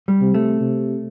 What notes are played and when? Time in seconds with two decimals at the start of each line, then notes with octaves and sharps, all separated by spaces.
0.08 G3
0.21 C3
0.34 A3
0.60 C3